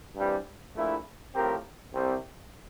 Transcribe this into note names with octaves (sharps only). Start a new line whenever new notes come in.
G2 E3 G3 C4
A#1 A#2 A3 E4
A2 F3 C4 G4 A#4
C2 C3 G3 C4